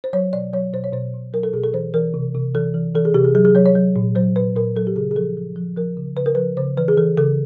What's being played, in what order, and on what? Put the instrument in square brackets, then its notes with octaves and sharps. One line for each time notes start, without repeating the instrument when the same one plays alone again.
[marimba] C5
F#3 C#5
B2 D5
F#3 C#5
B2 C5
C#5
B2 C5
B2
F#3 A#4
A4
B2 G#4
A4
E3 C5
E3 A#4
C3
C3
E3 A4
E3
E3 A4
G#4
C3 G4
G#4
F#3 G#4
G#4
F#3 C#5
C#5
F#3
A#2
F#3 C5
A#2 B4
A#2 A#4
F#3 A4
G4
C#3 G#4
G#4
F3 A4
F3
F3
F3 A#4
C#3
C#3 B4
A#4
F3 B4
C#3 C5
E3 B4
G#4
E3 A4
C#3 A4